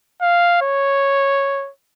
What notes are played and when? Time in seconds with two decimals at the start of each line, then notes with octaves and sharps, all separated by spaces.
0.22 F5
0.62 C#5